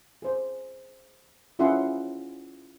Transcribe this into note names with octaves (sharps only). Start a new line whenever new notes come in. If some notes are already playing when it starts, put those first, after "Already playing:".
G#4 C5
C#4 E4 F4 G#4 F#5 C6